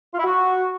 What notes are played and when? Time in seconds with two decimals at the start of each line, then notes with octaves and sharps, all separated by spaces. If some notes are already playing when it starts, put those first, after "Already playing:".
0.13 F4
0.19 E4
0.24 F#4